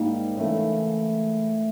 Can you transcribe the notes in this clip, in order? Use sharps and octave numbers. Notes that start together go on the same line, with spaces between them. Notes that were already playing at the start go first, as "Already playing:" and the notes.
Already playing: G#2 D#3 G3 A#3
C#3 E3 A3